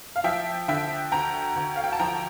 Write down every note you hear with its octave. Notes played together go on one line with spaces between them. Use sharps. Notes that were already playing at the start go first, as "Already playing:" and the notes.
F5
F3 E5 G5
D3 E5 G5
D2 G5 A#5
D2
F5
G5
A5
F3 G5 A#5